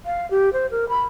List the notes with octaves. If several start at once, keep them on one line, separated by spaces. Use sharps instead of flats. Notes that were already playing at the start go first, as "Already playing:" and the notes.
F5
G4
C5
A#4
B5